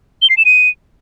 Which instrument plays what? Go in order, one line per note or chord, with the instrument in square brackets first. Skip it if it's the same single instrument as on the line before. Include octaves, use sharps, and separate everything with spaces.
[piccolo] G7
C7
E7
D#7